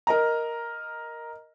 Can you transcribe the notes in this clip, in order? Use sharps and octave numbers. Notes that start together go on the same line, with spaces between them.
A#4 D#5 A#5